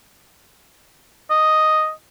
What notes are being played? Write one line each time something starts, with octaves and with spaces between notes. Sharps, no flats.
D#5